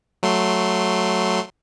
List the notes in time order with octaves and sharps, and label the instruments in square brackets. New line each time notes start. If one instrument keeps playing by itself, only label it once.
[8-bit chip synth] F#3 A3 C6